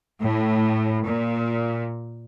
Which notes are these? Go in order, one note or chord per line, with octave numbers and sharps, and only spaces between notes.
A2
A#2